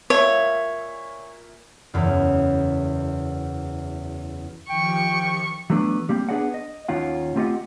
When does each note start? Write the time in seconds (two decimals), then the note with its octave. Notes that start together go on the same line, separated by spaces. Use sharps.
0.10 A#2 C#5 E5
1.94 F#1 E2
4.70 D#3 F3 G4 G5 C#6
5.70 E3 F#3 A3 B3 D4
6.09 G3 A#3 C4
6.29 B3 D4 G#4 D5 D#5 F#5
6.54 D#5
6.88 D#2 D#3 C#4 F4 F#5
7.36 A3 C4 F4 G4 D#5 F#5